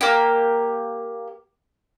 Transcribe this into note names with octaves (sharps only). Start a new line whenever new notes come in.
A#3 G4